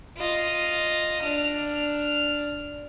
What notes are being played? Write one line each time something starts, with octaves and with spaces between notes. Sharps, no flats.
F4 D#5
D4 F6